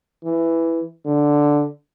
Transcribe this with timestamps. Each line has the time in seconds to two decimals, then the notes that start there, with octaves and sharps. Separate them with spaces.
0.24 E3
1.05 D3